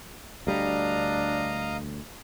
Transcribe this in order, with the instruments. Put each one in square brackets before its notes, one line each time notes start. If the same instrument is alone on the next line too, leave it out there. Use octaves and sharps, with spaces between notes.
[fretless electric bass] D2 G3 [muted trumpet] D4 [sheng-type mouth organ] D#5 F5 A#5